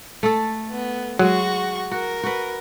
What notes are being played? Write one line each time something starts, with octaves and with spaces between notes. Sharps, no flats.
A3 A4
B3
F#3 G#3 F#4 G#4 C#6
F#4 A#4
F#4 B4